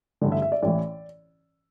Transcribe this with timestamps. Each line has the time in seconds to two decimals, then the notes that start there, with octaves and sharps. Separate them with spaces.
0.21 A1 G2 D3
0.32 E5
0.42 E5
0.52 D5
0.62 A1 A2 E3 D5